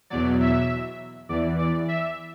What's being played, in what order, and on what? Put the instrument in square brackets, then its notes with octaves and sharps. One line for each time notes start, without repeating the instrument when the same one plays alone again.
[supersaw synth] E2 B2 F#3 D5
E5
E2 E3 D5
D5
E5